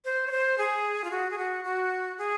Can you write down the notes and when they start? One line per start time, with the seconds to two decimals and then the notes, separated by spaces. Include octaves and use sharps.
0.05 C5
0.27 C#5
0.31 C5
0.58 G#4
1.04 F4
1.11 F#4
1.31 G#4
1.38 F#4
1.64 F#4
2.18 G#4